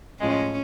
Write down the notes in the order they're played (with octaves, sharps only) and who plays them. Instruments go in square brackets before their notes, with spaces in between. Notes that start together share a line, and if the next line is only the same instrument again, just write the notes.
[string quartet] A2 F3 G#3 [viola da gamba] C#4